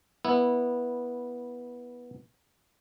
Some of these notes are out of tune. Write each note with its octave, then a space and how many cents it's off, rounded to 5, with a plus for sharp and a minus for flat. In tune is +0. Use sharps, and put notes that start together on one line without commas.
B3 -15 E4 -10